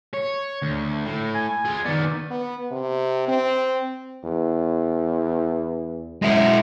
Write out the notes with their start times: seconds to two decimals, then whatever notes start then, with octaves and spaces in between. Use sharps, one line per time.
0.14 C#5
0.62 D2
1.06 A2
1.35 G#5
1.65 F4 G#4
1.85 D#3 B3 D5
2.30 B3
2.71 C3
3.28 C4
4.24 E2
6.22 F#2 G#3 E4